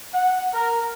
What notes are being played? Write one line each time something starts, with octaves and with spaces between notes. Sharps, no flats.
F#5
A#4